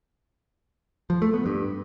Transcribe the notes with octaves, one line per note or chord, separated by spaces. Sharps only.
F3
A3
B3
G2